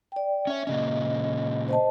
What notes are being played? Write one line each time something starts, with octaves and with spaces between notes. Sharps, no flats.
D5 G5
C#4 C#5 E5
A#2 C#3 C#4 D#5
C5 D#5 A5